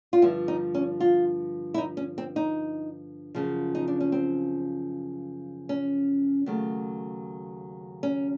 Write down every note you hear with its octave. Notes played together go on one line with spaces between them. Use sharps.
F4
G2 D3 F3 E4
D#4
C#4
F4
E4
D#4
C#4
C4
D#4
F#2 C#3 F3
D#4
D4
C#4
C4
C#4
D#2 C#3 F#3 A3
C#4